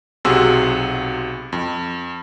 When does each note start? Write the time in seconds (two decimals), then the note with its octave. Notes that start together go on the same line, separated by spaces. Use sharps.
0.25 B1 C3 F#4 G#4 C6 E6
1.52 F2